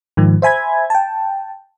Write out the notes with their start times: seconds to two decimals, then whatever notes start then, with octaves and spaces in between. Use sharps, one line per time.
0.17 G#2 D#3 F3
0.42 C5 E5 G#5 B5 G#6
0.90 G5 A5